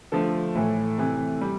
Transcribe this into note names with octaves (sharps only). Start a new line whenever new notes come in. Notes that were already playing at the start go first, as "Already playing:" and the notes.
D3 F3 A3 A4
A2 E3 A3
C3 E3 A3
G3